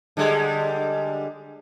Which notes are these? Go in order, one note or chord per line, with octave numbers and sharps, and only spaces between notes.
D3 G3 G#3